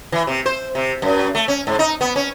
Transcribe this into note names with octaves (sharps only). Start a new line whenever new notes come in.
E3
C3
C5
C3
F#2
A3
C#4
G#2
D#4
B3
C#4